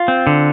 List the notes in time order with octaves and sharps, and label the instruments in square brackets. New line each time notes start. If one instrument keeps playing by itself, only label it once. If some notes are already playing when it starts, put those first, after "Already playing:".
Already playing: [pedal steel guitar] F4
C4
D3